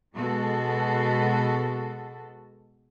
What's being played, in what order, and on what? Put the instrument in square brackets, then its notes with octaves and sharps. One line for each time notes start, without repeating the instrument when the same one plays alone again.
[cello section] B2 G#3 F#4 A4